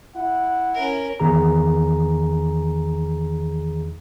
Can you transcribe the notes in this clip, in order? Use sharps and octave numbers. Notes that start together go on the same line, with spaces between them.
E4 F#5
C#4 A#4
E2 D#3 G#4 A#5